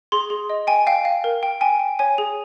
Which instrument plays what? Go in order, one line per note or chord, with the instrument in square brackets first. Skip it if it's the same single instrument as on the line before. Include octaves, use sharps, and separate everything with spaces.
[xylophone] G#4 C6
G#4
D#5
G5 G#5
F5 G5
F5
A#4
G5
G5 G#5
G5
C#5 G#5
G#4